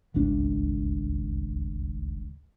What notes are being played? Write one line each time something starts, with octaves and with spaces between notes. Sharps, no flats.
D1 G#1 C#2 D4